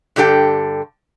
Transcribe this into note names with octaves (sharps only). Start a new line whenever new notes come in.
G2 D3 G4 A4 G5